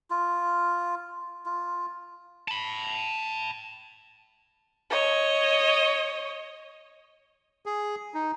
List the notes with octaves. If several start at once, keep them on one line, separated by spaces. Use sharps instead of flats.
F4
F4
A5 B5
C#5 D#5
G#4
D#4